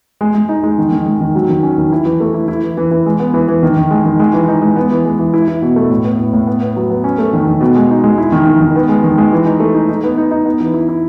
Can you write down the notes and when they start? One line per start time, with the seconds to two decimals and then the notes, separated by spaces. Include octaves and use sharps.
0.21 G#3
0.35 G#3
0.49 D#4
0.63 G#3
0.78 D#3
0.92 D#3
1.06 G#3
1.21 D#3
1.35 F#3
1.49 D#3
1.63 C#4
1.78 D#3
1.92 E4
2.05 E3
2.20 A3
2.34 E4
2.48 E4
2.63 E3
2.77 E3
2.91 E3
3.06 G#3
3.20 B3
3.34 E3
3.48 E3
3.63 D#3
3.77 D#3
3.91 G#3
4.05 D#3
4.20 G#3
4.34 E3
4.48 D#4
4.62 G#3
4.76 B3
4.91 E3
5.05 G#3
5.19 E3
5.34 E4
5.48 E4
5.62 B2
5.76 A3
5.90 A2
6.04 B3
6.19 A2
6.33 A2
6.47 B3
6.61 B3
6.76 F#3
6.90 B3
7.04 C#4
7.18 A3
7.33 D#3
7.47 D#3
7.61 B2
7.75 G#3
7.90 D#4
8.04 G#3
8.18 E4
8.32 D#3
8.47 D#3
8.61 D#3
8.76 B3
8.89 G#3
9.04 D#3
9.18 G#3
9.32 E3
9.46 D#4
9.60 A3
9.75 D#4
9.89 D#4
10.03 B3
10.18 D#4
10.31 D#4
10.46 B3
10.60 E3
10.74 E4
10.89 E4